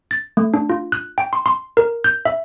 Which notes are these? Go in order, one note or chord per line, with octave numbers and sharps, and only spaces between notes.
A6
A3
D4
F4
F#6
G5
C6
C6
A#4
G6
E5